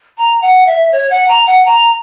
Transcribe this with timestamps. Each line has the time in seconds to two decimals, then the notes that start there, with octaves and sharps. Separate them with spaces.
0.18 A#5
0.42 F#5
0.67 E5
0.92 C#5
1.10 F#5
1.28 A#5
1.47 F#5
1.66 A#5